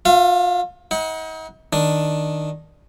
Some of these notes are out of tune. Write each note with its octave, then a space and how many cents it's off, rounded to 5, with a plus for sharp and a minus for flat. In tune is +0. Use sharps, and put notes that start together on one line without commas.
F4 +35 F5 -30
D#4 +40 F#5 +0
D#3 +0 D4 +0